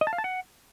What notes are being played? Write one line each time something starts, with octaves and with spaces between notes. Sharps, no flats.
D#5
A5
F5
A5
F#5